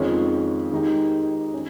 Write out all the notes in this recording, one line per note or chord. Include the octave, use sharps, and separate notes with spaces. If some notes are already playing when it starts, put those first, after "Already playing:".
Already playing: F2 D#3 G#3 C#4 F4
D#3 G#3 D#4 G4
C#4